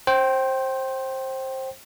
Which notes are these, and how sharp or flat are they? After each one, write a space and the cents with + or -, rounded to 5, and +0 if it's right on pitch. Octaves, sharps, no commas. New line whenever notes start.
C5 +20 G5 -15